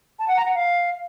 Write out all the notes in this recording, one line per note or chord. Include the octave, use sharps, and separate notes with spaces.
A5
F#5
A#5
F#5
F5